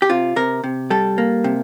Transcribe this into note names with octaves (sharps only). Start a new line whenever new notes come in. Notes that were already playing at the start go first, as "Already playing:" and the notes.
G4
C3 F4
C3 A#4
C3
G3 A4
A#3
C3